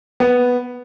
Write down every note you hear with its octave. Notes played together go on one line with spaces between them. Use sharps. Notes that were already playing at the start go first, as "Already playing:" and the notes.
B3